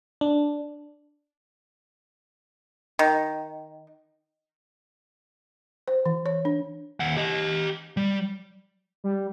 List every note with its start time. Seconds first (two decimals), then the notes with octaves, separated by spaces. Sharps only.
0.21 D4
2.99 D#3
5.88 C5
6.06 E3
6.26 C#5
6.45 D4
7.00 D#2 F#5
7.17 G4 D#5
7.97 G3
9.04 G3